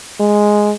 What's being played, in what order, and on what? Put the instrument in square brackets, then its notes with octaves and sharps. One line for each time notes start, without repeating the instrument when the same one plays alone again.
[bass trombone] G#3